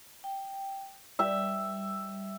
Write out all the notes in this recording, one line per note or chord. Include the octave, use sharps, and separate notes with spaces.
G5
G3 E5 G5